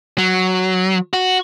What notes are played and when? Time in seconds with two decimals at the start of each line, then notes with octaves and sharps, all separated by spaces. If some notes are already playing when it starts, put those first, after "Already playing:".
0.18 F#3
1.13 F#4